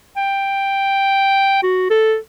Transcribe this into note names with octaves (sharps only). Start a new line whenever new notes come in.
G5
F#4
A4